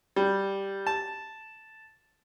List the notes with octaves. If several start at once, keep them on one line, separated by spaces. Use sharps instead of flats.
G3
A5